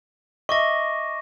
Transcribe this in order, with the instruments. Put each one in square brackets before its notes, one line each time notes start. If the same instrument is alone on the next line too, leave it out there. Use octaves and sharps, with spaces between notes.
[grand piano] D#5 E5 [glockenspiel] C#6 D6 A#6